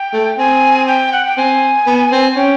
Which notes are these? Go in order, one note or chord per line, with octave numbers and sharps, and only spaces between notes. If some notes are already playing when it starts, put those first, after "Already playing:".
Already playing: G5
A3
C4 G#5
G5
F#5
G5
C4 G#5
B3
C4
C#4 G5